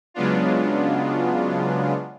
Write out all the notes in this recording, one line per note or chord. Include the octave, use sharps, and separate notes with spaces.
C#3 F#3 G#3 B3 D4 F4